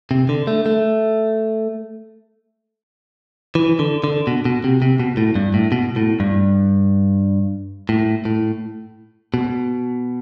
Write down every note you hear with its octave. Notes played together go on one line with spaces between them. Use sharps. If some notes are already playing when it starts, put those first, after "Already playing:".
C3
D3
A3
A3
E3
D3
D3
B2
B2
C3
C3
B2
A2
G2
A2
B2
A2
G2
A2
A2
B2